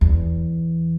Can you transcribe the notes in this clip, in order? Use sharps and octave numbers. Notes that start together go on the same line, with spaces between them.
E2